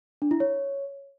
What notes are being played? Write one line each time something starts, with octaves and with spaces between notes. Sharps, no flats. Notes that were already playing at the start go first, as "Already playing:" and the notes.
D4
E4
C#5